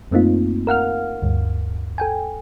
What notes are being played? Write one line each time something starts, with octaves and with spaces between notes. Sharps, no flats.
F#2 A3 A#3 C4 D#4 F4
A#4 F5 F#5 F6
D2 G2
A4 G5 G#5